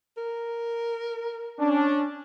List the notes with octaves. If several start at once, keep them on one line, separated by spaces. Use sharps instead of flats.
A#4
C#4 D4